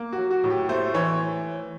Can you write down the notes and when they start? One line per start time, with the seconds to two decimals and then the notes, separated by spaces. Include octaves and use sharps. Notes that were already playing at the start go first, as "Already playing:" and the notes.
Already playing: A#3
0.12 F#4
0.18 F#3
0.31 F#4
0.44 A2
0.50 G4
0.69 A3 C5
0.94 E3 C#5